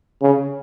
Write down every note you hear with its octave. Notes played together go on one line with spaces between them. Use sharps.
C#3